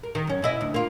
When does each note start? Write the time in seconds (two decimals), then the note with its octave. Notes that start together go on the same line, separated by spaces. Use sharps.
0.03 A#4
0.15 D#3
0.27 F#2 C#4
0.42 B2 E4 D#5
0.61 D2
0.74 A#3 F4